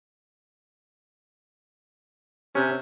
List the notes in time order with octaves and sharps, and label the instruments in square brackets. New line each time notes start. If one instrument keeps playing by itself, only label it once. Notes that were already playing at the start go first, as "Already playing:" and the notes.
[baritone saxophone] C3 [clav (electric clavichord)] C#4